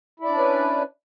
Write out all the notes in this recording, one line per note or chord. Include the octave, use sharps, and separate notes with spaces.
C#4 D4 E4 B4 D5